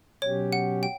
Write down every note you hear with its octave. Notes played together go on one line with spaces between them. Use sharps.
B2 F#3 C#4 G4 C#5
F#5
G5